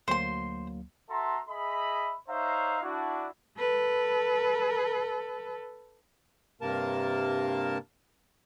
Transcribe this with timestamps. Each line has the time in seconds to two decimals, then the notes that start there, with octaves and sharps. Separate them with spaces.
0.08 D2 F#3 A#3 C5 C6
1.10 F#4 A4 E5 A#5 C6
1.50 G#4 D#5 E5 B5
2.29 D#4 C5 C#5 E5 F5 A#5
2.82 D4 E4 F#4
3.58 A4 B4
6.61 G2 C3 A#3 A#4 A5